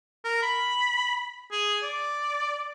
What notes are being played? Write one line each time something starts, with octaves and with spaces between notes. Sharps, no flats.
A#4
B5
G#4
D5